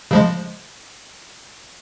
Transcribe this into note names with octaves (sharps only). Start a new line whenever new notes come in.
C#3 F3 G#3